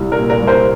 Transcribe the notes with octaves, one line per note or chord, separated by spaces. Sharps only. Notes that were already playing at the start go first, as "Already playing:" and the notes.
Already playing: C2
A#4
A#2
A#4
C2
A#4 C5